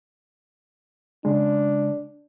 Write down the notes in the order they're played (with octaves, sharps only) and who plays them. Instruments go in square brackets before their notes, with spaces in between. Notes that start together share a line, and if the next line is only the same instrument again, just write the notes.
[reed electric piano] C#3 G#3 [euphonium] D4